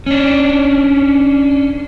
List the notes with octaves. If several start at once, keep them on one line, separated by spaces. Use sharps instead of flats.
C#4 D4